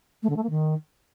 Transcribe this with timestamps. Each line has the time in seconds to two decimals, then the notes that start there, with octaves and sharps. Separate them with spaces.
0.23 A3
0.29 D3
0.36 A3
0.43 A#3
0.50 D#3